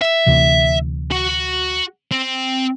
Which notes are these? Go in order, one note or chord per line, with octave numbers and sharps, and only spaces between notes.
E5
D2 C3 E3
F#4 F#5
C4